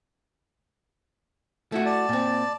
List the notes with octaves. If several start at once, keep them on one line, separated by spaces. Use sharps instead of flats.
A3 E4 F#4
D5 A5
A#2 C4